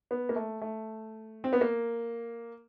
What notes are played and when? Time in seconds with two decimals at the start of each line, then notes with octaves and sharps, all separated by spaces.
0.11 B3
0.29 A#3
0.36 A3
0.62 A3
1.44 C4
1.53 B3
1.61 A#3